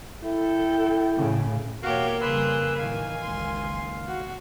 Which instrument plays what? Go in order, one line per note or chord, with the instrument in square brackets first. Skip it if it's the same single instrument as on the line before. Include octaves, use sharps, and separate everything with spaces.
[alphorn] E4 [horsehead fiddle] A4 G5
[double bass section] A2 C#3
[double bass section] E2 B2 [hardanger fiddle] A#3 [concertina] F#4 F5 [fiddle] G4 C#5
[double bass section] F2 C#3 G3 [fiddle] G#4 C6 [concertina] B4 E6
[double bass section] A2 D#3 E3 [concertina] F5 [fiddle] G#5
[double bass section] F#1 C#2 D#3 [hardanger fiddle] C6
[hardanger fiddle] F#4